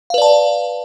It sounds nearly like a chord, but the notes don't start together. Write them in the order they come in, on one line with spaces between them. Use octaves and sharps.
F5 B4 D5 A5